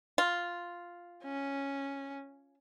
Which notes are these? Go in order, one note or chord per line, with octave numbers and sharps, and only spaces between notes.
F4
C#4